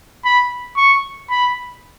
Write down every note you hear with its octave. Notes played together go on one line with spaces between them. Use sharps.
B5
C#6
B5